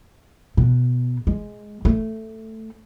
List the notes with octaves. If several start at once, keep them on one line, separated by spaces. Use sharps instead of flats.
B2
G#3
A3